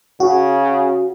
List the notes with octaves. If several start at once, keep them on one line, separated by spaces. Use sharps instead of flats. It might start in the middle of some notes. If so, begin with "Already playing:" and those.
C#3 F#4